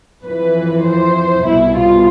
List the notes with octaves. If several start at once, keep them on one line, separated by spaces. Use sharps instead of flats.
F2 E3 B4
C5
C2 B2 E4
F4